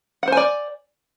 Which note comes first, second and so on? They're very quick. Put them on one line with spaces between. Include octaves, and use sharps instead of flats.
F#5 C5 G#5 D5